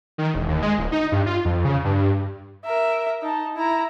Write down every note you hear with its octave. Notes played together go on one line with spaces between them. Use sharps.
D#3
E1
D#2
G#3
D1
D#4
G2
F4
F2
C#3
G2
A#4 E5
D#4 A5
E4 A#5